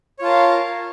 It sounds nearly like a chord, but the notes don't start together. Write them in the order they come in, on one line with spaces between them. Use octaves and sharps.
C#5 F4 A5 A#4 F5